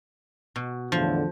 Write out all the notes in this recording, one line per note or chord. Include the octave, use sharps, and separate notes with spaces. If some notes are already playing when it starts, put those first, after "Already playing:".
B2
E2 A2 D3 F3